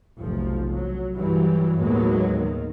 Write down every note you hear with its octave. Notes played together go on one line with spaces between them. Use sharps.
F1 B1 F3
F#3
G2 E3 F#3 G3
D#2 A2 F#3 G#3 A#3 B3
D#3